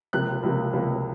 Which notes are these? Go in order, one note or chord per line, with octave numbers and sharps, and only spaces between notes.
C#2 C3 F3 A#3 F#6
C#2 C3 F3 A#3
C#2 C3 F3 A#3